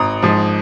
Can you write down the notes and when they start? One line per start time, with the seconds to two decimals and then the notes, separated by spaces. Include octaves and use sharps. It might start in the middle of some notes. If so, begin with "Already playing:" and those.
Already playing: G#1 A#5 D#6
0.22 G#2 F3